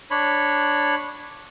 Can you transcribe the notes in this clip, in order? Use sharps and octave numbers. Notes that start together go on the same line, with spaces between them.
D4 C#5 B5